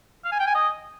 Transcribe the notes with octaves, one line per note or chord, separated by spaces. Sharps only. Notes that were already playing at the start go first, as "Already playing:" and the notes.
F5
G#5
G5
G#5
D#5